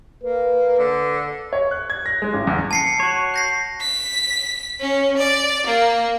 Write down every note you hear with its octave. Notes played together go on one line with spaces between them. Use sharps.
A#3 B4
D3
C#5
F#6
G#6
A#6
G#3
A1
E2
A5 C7 C#7
F#4 C#5
G6 A#6 C7
B6
C#4
D5
A#3